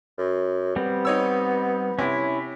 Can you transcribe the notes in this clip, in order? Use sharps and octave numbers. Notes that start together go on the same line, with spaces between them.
F#2
G3 B3 C4
D#4 C#5 E6
C3 C#4 E4